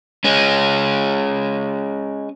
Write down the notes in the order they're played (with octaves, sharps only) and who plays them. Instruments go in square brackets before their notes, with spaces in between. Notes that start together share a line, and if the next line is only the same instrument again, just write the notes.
[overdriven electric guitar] G#3 C#4